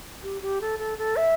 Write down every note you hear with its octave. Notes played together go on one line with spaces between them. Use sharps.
G4
G4
A4
A4
A4
E5